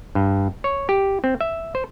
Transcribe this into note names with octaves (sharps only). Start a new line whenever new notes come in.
G2
C#5
G4
C4
E5
C5